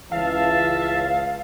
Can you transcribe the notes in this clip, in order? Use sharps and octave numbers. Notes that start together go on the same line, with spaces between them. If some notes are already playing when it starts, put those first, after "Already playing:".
C#2 E3 E5 F5 A5